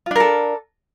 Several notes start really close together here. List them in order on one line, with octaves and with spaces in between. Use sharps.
F4 D4 A#4 A4